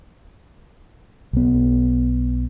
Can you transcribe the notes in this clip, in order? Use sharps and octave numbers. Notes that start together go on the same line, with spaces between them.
B1 B3